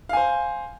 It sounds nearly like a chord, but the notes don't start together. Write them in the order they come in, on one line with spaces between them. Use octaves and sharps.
F5 G#5 C5